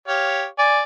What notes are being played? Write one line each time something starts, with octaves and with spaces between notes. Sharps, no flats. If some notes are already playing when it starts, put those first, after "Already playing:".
G4 C#5 F5
D5 G#5